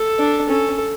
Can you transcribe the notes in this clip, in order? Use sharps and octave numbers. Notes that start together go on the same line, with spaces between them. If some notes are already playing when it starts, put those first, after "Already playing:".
Already playing: A4
D4
C#4 A4